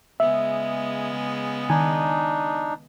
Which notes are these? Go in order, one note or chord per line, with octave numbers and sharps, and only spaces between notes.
C#3 G#3 B3 E5
D#3 D4 D#4 G#5